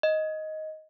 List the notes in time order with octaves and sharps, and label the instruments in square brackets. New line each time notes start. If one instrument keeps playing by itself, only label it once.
[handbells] D#5